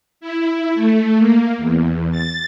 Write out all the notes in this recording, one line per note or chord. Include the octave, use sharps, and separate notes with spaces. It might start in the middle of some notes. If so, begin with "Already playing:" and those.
E4
A3
A#3
E2
A6